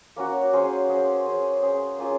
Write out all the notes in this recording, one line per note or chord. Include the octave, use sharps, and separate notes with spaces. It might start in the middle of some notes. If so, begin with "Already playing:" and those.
A#3 C#4 F#4 C#5
C#4 G#4 C5
C#4 G#4 C5
C#4 G#4 C5
C#4 G#4 C5
A#3 C#4 F4 G#4